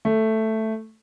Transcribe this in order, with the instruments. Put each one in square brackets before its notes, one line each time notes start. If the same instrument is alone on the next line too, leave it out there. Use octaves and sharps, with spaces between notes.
[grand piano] A3